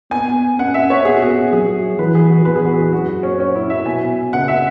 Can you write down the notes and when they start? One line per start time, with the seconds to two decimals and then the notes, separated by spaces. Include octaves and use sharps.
0.11 B3 G#5
0.58 C#4 F#5
0.74 E5
0.90 C#5
1.05 B3 G#4
1.14 F#4
1.22 G#4
1.52 F#3 G#4
1.99 E3 B4
2.15 G#4
2.30 F#4
2.45 E2 B4
2.56 G#4
2.65 F#4
2.74 G#4
2.93 F#2 F#4
3.23 C#4
3.40 C#4
3.56 E4
3.70 E5
3.86 B2 G#5
4.33 C#3 F#5
4.48 E5